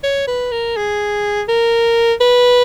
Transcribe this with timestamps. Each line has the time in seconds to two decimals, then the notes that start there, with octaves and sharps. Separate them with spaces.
0.04 C#5
0.28 B4
0.52 A#4
0.77 G#4
1.48 A#4
2.21 B4